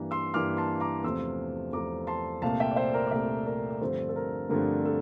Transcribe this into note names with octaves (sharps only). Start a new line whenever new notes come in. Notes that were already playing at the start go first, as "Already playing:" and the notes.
Already playing: G2 E3 A#3 A#5
C6 E6
G2 E3 A#3 D6 F6
A5 C6
A#5 D6
E2 C3 F3 A3 C6 E6
E2 C3 F3 A3 A#5 D6
A5 C6
C2 A#2 A3 F5 A5
E5 G5
D5
C5 E5
A#4 D5
D5
C2 A#2 A3 C5 E5
A#4 D5
D5
G2 D3 F3 A3 C4 A4 C5
A4
A#4
G2 D3 F3 A3 C4 A#4
A4